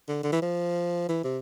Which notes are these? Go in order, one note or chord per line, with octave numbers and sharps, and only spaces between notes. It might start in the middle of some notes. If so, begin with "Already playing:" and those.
D3
D3
E3
F3
E3
C3